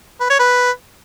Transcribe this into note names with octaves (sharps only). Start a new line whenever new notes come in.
B4
C#5
B4